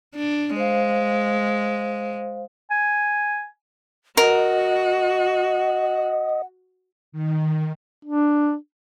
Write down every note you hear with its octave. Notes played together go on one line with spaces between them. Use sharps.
D4
G#3 C5 F5
G#5
F#4 A#4 D#5 F#5
D#3
D4